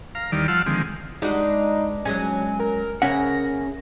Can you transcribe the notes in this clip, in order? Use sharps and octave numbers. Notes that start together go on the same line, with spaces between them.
F5 A#5
D#2 D#3 E3 G3 D5 F6
F3 F4 F#5 A5 E6 F6
D3 D#3 F3 G#3 C4
G#3 D4 D#4 F#4 B4
F#3 G#3 C#4 G#5
A#4
C#3 A#3 C#4 E5 F#5 A#6